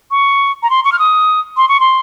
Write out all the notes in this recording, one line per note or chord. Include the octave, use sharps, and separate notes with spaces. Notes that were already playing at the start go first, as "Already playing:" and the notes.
C#6
A#5
C6
C#6
F6
D#6
C6
C#6
C6